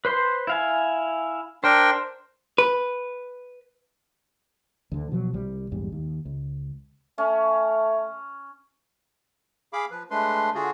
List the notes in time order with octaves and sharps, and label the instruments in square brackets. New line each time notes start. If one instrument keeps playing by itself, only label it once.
[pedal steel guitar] B4 C5 C6
E4 F5 G#5
[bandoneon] D4 A#4 G5 [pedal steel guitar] C5
[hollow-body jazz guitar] B4
[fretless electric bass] D2 D3
B2 F3 F#3
C2 G3
A#1 E2 G#2 G3
D#2
C#2
[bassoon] A3 [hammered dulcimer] C#4
[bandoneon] G#4 F5 B5 D6
F3 B4
G#3 A3 D4 B4 C6
D3 F4 F#4 G#4